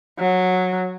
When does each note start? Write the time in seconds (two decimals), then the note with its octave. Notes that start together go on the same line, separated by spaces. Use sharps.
0.19 F#3